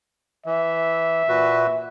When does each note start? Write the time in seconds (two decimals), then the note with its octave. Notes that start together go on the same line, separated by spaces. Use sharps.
0.46 E3 E5
1.29 A#2 F#4 B4